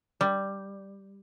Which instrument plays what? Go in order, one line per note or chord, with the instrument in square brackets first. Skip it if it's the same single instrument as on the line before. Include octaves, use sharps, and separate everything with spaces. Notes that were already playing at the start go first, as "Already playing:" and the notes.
[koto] G3